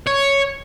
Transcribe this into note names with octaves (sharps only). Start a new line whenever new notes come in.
C#5